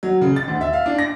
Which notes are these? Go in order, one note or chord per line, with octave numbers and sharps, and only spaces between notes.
F#3
C#3
A6
D2
E5
F5
D4
A#6